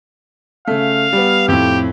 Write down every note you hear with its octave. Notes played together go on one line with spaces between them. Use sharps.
C#3 A3 F5
G3 B3
F2 A2 G4